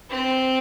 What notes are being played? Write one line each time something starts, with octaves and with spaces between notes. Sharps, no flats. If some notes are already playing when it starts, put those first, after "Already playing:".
C4